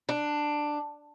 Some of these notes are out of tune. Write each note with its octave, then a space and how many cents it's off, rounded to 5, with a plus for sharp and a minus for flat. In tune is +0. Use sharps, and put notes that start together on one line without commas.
D4 +10